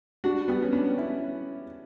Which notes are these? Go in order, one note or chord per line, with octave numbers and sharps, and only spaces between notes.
D4 F#4
G3 B3
C#4
B3 D4
C#4 E4